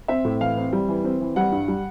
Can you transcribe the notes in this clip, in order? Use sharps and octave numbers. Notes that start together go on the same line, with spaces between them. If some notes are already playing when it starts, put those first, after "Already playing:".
C4 E5
A2
E3 F5
C4
G3
E3
C4
E3
G3 F#5
G2
G3